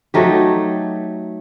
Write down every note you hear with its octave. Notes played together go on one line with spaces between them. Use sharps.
F#3 A3 D#4 G4